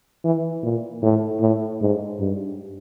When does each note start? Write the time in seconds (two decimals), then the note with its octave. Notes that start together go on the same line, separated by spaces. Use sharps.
0.24 E3
0.63 A#2
1.03 A2
1.41 A2
1.81 G#2
2.20 G2